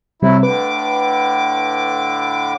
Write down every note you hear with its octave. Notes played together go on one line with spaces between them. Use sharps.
C3 F#3 G3 A3 C4 E4
A2 D3 B4 D6